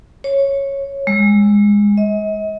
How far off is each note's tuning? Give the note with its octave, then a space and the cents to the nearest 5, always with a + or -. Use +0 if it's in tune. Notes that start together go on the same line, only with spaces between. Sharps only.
C#5 -10
G#3 -15
D#5 +40